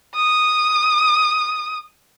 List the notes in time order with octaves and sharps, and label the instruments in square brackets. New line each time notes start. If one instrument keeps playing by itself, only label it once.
[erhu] D#6